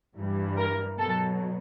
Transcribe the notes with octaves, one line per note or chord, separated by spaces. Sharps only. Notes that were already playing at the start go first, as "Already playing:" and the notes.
G2 E3 G3
A#4
B2 F#3 A4